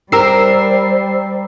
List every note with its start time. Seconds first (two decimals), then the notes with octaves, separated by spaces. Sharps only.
0.12 G3 G4 A#4 C5 A#5 E6 C7